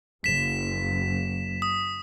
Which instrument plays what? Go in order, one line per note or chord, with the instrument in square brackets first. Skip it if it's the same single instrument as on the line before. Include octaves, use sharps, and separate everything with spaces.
[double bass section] F#1 [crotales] B6 E7
[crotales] D#6